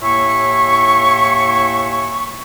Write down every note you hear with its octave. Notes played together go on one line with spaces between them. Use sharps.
D#2 A2 E4 E5 G#5 C#6